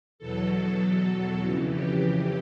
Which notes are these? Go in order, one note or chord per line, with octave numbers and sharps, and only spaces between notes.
E2 B2 F#3 A4
A4
F2 C#3 E3
G4